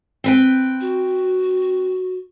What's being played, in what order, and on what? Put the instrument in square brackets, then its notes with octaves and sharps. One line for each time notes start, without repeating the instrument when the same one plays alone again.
[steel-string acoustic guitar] C4 B4 G5
[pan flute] F#4